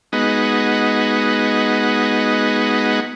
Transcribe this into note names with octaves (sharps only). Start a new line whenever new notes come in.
G#3 B3 D#4 F#4